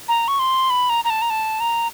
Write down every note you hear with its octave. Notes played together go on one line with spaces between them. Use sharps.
A#5
C#6
C6
B5
A#5
A#5
A5
A#5
A5
A#5